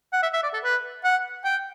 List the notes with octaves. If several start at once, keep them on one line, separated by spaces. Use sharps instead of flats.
F#5
E5
E5
D5
A4
B4
F#5
G5